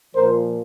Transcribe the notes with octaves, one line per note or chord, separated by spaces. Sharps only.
A#2 F3 A#4 C5